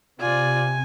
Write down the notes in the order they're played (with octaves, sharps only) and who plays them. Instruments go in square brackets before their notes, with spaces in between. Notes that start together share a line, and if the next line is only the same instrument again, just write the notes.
[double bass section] C3 [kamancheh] F4 D5 [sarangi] G#5